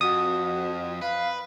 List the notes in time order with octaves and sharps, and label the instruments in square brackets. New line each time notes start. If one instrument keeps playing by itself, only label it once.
[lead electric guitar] F2 [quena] F#4 [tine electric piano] D#6
[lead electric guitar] B4 [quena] F5